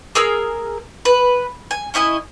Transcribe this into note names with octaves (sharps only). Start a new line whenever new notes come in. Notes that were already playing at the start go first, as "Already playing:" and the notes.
G#4 A#4 E6 F6
B4
G#5
C#4 E4 D#5 G#5